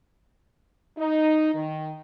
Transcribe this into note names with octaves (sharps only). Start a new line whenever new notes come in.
D#4
D#3